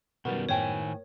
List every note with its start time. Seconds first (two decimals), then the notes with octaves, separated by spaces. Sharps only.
0.25 F#2 B2 D#3 G3 B3 F#4 A#4
0.49 A2 D#3 C5 C#5 G5 G#5